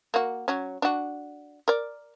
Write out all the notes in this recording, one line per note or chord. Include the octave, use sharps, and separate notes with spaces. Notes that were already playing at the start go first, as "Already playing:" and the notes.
A#3 F#4
F#3 C#4
D4 F#4
A#4 D5